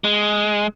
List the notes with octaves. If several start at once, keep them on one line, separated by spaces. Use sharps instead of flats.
G#3